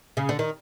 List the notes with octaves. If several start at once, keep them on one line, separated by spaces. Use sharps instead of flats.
C#3
D3
D#3